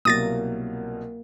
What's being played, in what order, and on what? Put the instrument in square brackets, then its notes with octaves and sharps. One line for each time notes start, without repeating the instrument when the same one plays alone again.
[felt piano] C2 B2 F#3 [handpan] A#3 [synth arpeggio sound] D#6 A6 A#6